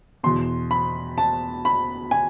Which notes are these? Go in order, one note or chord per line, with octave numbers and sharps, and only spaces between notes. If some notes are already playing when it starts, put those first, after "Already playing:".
E2 B2 C6
B5
A5
B5
G#5